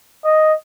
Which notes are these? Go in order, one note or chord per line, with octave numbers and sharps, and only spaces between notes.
D#5